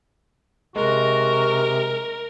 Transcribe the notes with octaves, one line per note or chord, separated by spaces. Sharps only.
C3 G#3 F#4 A#4